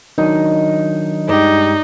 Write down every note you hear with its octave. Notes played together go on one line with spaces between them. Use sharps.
D#3 F#3 D4 D#4
G2 G#3 D#4 G4 D5